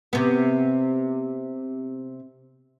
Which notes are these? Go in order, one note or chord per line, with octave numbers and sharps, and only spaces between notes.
C3 B3